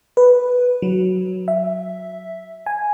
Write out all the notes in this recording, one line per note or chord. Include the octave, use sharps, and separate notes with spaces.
B4
F#3
E5
G#5